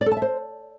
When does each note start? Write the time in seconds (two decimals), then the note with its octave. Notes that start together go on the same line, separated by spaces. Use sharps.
0.01 D5
0.06 A4
0.11 A5
0.17 E5
0.22 C5